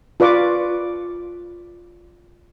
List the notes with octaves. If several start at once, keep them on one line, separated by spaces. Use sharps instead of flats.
F4 B4 D5 C#6 D6